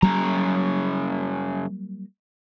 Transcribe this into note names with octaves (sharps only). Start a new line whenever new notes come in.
F#2 C#3 F#3 G3 A#3 A#5